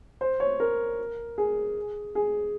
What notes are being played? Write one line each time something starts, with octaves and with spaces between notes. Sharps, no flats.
C5
C#5
A#4
G#4
G#4